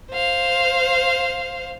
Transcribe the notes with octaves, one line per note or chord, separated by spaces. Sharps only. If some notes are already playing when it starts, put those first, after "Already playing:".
C5 F5